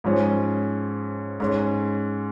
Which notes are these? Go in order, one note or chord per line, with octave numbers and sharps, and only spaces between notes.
G#2 F3 C#4
G#2 G#3 C#4